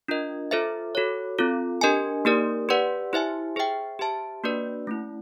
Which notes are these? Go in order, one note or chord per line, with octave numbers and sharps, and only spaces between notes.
D4 F4 A#4 D#5
F4 A4 C5 E5
F#4 A4 C#5
C4 F4 A4
D4 G4 A#4 D#5 G#5
A#3 D#4 G4 A#4 D5
G4 B4 D5 F#5
E4 G4 C5 E5 G#5
G#4 C5 E5 G5
G4 C5 E5 A5
A#3 D4 F#4 B4 D5
A3 C#4 E4